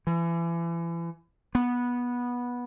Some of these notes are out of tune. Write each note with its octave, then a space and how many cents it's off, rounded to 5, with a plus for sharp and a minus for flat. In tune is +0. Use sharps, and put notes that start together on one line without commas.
E3 +35
B3 -15